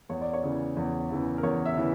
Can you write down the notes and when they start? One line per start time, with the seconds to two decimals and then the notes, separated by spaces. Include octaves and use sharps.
0.09 E2 C#5
0.21 D5
0.33 C#5
0.43 C#3 E3
0.77 E2
1.10 C#3 E3
1.38 A#4
1.43 E2 C#5
1.66 E5
1.76 C#3 E3